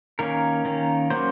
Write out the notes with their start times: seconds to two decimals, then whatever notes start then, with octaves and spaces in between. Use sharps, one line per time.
0.19 D#3 A#3 C#4 A#4
0.65 D#3 A#3 C#4
1.10 F#3 A#3 C#4 C5